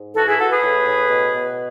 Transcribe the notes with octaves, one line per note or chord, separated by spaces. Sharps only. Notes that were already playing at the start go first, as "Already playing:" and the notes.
Already playing: G#2
E3 F#4 A4
E4 G#4
E3 F#4 A4
G#4 B4
A2
A2
B2
B2